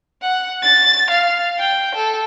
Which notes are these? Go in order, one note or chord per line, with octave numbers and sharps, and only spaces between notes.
F#5
A6
F5
G5
A4